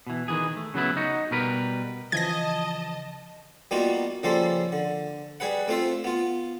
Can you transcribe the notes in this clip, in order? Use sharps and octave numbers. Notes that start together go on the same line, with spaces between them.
B2 E3
D#3 E3 G#4
A3
C#3 F#3 B3 E4
D#4 F#4
B2 G3 A#4 B4
C#3 E3 F3 D#5 A5 G#6 A#6
G3 A#3 B3 D#4 F4 F#4
C#3 F3 G3 A#3 A4 C6
D3
G3 G#4 B4 F#5
A3 C4 F4 C5 E5
B3 F4